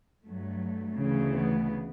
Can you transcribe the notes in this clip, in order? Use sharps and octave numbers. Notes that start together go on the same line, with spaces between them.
G2 F#3 A3
D2 C#3 E3
B3